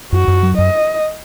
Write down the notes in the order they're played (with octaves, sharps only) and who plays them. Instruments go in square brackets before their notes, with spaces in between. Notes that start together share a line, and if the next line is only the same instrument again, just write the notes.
[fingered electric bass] F#2 [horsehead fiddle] F#4
[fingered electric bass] F#2
F#3
[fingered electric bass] F#2 [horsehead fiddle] D#5